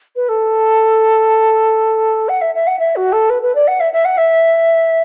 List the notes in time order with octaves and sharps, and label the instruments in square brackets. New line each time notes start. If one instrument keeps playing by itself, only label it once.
[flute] B4
A4
F#5
E5
E5
F#5
E5
F#4
A4
B4
B4
D5
F#5
E5
E5
F#5
E5